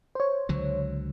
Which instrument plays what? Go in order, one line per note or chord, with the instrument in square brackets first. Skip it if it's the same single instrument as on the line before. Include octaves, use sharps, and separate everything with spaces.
[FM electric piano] C5 C#5
[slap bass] C#2 D3 F#3